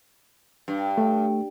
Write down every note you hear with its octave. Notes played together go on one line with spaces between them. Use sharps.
G2
A3